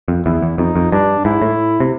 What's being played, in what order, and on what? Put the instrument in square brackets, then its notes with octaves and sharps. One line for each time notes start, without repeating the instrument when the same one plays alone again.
[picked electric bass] F2
[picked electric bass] E2 [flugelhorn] E4
[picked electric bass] E2
[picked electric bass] F2 [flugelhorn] D#4
[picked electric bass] F2
[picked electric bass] G2 [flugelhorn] D4
[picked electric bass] G#2 [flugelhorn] E4
[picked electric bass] A2
C3